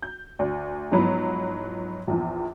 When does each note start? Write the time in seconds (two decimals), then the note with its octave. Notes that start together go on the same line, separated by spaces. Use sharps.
0.02 G6
0.39 D2 D5
0.91 G#2 F3 F#3 B3 E4
2.07 A#1 E2 F3